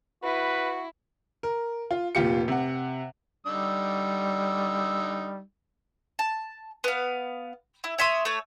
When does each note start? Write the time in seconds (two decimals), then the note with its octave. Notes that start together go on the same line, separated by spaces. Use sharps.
0.23 E4 F#4 B4
1.43 A#4
1.91 F4
2.15 F1 A#2 F4 G4 C#7
2.48 C3 F#5
3.46 D3 G3 D#4 E6
6.19 A5
6.84 B3 F5
7.84 E4
7.98 C#5 E5 C6 D#6
8.25 A3 C#5